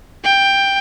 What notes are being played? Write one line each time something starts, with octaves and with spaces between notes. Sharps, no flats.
G5